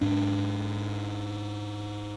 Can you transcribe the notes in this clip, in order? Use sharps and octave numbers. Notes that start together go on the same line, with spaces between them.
G#2 D4